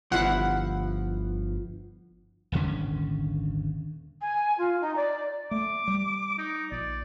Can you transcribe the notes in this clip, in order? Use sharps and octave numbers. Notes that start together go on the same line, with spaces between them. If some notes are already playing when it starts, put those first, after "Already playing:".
G1 F3 E4 F#5
D#1 G#1 D3 C#4
G#5
F4
D#4
D5
A3 D6
G3
D#4
A#1 D5